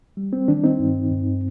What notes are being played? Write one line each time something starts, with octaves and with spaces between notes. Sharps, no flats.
G3
C4
D#3 D4
C4 D#4
G2
G2